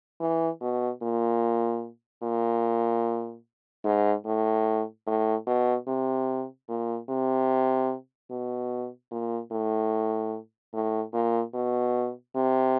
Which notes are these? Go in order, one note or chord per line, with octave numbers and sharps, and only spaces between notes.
E3
B2
A#2
A#2
G#2
A2
A2
B2
C3
A#2
C3
B2
A#2
A2
A2
A#2
B2
C3